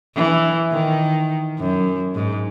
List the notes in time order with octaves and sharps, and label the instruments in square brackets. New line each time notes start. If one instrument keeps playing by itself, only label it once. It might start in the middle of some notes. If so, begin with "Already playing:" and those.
[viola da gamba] E3
D#3
F#2
G#2